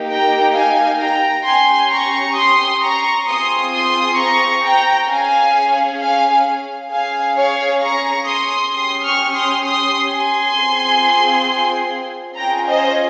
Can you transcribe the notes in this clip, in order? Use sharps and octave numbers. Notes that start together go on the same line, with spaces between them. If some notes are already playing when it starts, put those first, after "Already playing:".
Already playing: A#3 D#4 G4
G5 A#5
F5 G#5
G5 A#5
C#4 G4 G#5 C6
A#5 C#6
C6 D#6
A#5 C#6
C4 F4 G#4 C6 D#6
C6 D#6
A#5 C#6
G5 A#5
C#4 G#4 F5 G#5
F5 G#5
C#4 G#4 F5 G#5
C#5 F5
A#5 C#6
C6 D#6
C#4 G4 C6 D#6
C#6 F6
C6 D#6
C6 D#6
G#5 C6
C4 F4 G#4
C#4 F4 G#4 G5 A#5
C5 D#5